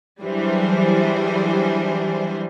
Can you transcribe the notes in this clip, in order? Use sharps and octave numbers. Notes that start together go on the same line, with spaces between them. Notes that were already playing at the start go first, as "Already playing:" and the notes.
E3 F#3 G3 D4 G#4 C5